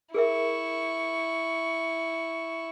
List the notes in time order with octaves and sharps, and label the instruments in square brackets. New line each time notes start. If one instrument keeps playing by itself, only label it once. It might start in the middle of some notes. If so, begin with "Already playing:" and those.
[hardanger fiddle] E4 C#6 [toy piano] G#4 A#4 E5